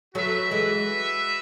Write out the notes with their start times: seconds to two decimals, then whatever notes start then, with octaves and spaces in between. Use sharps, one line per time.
0.15 F#3 A3 F#4 B4 E5
0.51 E3 G#3